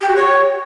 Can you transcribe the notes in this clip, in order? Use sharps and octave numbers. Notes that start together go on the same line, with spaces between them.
G4
F#4
C#5